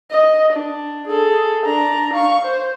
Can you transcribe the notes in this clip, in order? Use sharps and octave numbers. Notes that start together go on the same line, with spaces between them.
D#5
D4
G#4 A4
D4 A#5
F5 C#6
C5